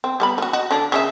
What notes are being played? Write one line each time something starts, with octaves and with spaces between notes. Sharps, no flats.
C4
G3 B3 B5
F3 F#4
F#4 D#5
D3 D4
C#3 C#4 E5